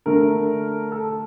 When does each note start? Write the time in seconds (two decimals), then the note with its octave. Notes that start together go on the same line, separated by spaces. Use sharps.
0.06 D3 A3 D4 A#4
0.92 A4